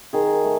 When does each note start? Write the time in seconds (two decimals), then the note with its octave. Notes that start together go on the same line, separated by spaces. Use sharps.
0.13 D#3 G#4
0.44 A3